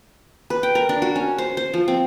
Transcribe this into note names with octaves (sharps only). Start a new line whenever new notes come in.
B4
G5
A#4
D4
F#4
C#4
C5
C5
F3
C4